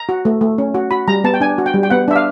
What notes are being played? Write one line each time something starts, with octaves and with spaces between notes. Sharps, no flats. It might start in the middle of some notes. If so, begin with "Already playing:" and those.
Already playing: A#5
F#4
A3
A3
C#4
F#4
F#4 B5
G3 A#5
B3 A5
G5
D4 G#5
F#4
G5
G3
G5
B3 F#5
D4 E5
F5